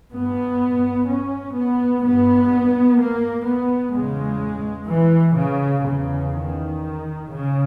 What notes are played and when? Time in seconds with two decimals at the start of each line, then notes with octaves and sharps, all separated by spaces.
0.12 G2 B3
1.08 C#4
1.55 B3
2.03 G2 B3
2.99 A#3
3.46 B3
3.94 E2 C#3 G#3
4.89 E3
5.37 C#3
5.84 E2 C#3
6.32 D#3
7.28 C#3